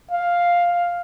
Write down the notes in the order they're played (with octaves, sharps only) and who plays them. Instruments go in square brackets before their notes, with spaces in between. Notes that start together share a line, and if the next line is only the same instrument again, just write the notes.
[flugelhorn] F5